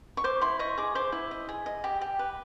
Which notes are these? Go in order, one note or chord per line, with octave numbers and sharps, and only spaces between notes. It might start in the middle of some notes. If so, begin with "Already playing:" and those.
C#6
C5 D6
E4 C6
D#5 C#6
G#4 D6
C5 D6
E4
D#5
G#4
D#5
G4
G4
B4